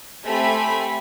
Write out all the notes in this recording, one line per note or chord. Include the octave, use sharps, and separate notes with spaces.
A3 C4 G4 G#5 B5 B6